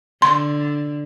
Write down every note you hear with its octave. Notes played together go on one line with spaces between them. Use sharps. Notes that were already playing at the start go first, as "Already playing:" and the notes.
D3 C6